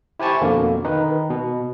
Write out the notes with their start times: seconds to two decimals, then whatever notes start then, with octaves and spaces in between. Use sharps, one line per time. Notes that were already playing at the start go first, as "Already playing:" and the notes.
0.20 E4 G4 C5 G#5 A5 C#6
0.41 F2 B2 D3 A#3
0.85 D#3 D#4 B4
1.30 B2